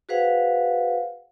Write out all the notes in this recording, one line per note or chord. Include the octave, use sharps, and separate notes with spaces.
F#4 G#4 B4 C5 F5 F#5